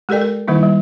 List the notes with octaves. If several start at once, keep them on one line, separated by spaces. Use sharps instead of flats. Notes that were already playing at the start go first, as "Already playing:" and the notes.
G#3 G4 A4 A#4 D5 G5
A#4
D#3 G3 A#3 D#4 E4
G3